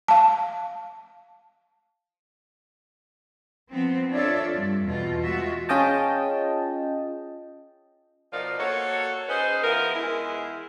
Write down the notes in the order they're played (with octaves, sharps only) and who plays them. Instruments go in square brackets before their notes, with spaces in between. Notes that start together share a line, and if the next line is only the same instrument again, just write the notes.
[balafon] F5 A5
[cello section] F3 B3 C4
D4 F4 A4 C#5 D5 E5
G2
E2 B2 F4
G#3 F4 F#4 E5
[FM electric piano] C#4 F4 G#4 D#5 G5 A5
[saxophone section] B2 F3 D#4 A#4 D5
A#3 F#4 A4 C#5
C#4 D#4 G#4 B4 C5
F3 B3 E4 A#4
E2 G#3 E4